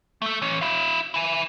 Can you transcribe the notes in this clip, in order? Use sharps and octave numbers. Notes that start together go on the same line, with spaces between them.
A3 A4
E3 C#5
E4 F5
E4 G#5